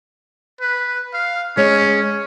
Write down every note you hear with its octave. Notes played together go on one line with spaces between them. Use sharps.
B4
F5
G#3 C#4 C#5